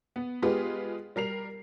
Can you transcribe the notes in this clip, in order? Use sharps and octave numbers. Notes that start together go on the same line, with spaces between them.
B3
G#3 B3 F4 G4 G#4 B4
G3 A#4 C7 F7